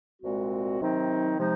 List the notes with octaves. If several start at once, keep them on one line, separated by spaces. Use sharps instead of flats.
C2 A#2 G#3 C4 F#4
C3 D#3 F#3 C4 D#4
C3 F3 G#3 D#4